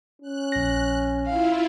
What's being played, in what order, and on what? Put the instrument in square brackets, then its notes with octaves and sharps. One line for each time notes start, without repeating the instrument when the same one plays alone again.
[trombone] C#4 [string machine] F#6
[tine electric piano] A#1 A#6
[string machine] E4 F4 [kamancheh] F5